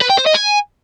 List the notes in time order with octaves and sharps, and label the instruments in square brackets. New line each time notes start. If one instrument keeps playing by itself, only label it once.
[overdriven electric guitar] B4
G5
C5
D#5
G#5